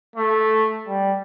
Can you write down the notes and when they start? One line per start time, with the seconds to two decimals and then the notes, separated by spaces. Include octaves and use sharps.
0.16 A3
0.88 G3